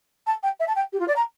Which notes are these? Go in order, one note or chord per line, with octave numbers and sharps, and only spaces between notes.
A5
G5
E5
A5
G5
G4
F4
D5
A#5